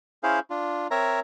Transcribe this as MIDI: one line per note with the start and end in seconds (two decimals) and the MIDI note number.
0.23 0.39 61
0.23 0.39 64
0.23 0.39 68
0.23 0.39 72
0.23 0.39 77
0.50 0.87 62
0.50 0.87 65
0.91 1.20 60
0.91 1.20 70
0.91 1.20 73
0.91 1.20 76
0.91 1.20 82